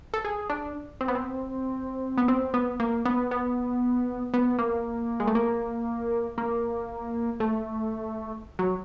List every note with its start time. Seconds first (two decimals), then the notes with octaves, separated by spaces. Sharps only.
0.14 A4
0.25 G#4
0.50 D4
1.01 C4
1.08 B3
1.15 C4
2.18 B3
2.28 C4
2.54 B3
2.80 A#3
3.05 B3
3.31 B3
4.34 B3
4.59 A#3
5.20 G#3
5.28 A3
5.35 A#3
6.38 A#3
7.40 A3
8.59 F#3